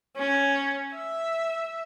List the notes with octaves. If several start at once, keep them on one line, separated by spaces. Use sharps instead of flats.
C#4
E5